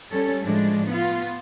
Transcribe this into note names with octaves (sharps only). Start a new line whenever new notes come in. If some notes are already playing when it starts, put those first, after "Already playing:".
G3 C#4 A4
A2 F3 G#3 D4
B3 F4